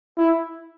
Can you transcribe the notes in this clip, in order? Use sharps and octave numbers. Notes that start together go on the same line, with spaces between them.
E4